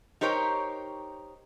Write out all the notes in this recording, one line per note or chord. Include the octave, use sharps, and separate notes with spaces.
D#4 G4 A#4 C5 C#5